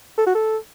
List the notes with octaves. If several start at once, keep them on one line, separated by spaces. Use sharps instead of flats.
A4
F#4
A4